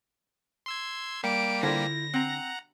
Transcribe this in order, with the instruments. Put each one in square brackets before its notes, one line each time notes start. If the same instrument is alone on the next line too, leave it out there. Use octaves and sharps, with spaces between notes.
[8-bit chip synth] C6 E6 G#6
[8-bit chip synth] G3 A#3 G4 [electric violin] D7
[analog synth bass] D3 [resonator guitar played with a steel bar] E4 F4 C5 [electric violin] A#6
[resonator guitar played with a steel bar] C4 [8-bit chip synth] F#5 A#5